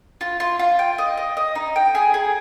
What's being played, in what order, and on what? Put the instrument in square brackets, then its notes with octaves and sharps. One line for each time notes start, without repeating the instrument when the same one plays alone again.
[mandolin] F4
F4
F4
G5
D#5
D#5
D#5
D#4
G5
G#4
G#4